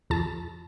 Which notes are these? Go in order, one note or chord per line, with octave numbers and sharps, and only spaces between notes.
F2 A5